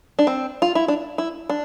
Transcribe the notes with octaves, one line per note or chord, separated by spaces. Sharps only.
D4
C4
F4
E4
D4
E4
D4